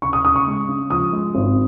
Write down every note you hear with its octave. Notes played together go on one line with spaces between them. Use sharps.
C#3 C#6
D#6
C#3 D#6
C#6
G#3
C#3
F3 D#6
G#3
G#1